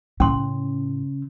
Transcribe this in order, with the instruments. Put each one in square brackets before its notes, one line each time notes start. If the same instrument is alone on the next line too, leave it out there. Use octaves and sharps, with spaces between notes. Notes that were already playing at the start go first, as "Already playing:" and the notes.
[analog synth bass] A2 [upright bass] C#3 [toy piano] C#4 C6